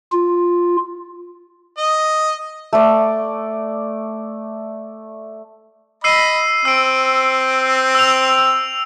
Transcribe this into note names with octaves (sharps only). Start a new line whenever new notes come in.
F4
D#5
A3 D5
D#5 B5 E6 C7 D#7
C4 E6 D7
E6 F7